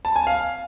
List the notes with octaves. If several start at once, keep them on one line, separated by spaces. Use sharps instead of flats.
A5
G#5
F5